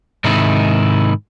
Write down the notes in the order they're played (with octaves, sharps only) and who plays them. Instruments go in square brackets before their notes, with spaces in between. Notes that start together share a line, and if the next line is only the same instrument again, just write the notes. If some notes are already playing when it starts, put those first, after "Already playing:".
[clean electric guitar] G#2 C3 D#3 D#4 E4